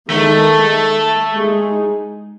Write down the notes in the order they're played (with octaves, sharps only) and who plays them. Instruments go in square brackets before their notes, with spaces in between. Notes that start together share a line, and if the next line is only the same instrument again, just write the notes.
[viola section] D#3 G#3 D#4 [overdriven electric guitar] A3
[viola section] G#3 D#4 G#4